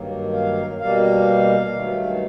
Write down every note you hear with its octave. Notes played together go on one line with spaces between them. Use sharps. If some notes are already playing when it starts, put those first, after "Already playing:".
Already playing: G2 D#3 F#3 A#3
F5
B2 G3 A#3 F5
G2 D#3 F#3 A3